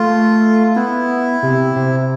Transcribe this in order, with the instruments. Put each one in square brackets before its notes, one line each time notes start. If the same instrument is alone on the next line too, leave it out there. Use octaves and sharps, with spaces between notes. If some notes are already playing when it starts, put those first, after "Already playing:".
Already playing: [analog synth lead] A3 [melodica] F4
[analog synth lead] B3 [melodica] E4
[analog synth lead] C3
C3